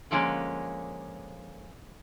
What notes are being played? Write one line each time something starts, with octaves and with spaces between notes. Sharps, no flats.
D3 F3 G#3 A#3 C#4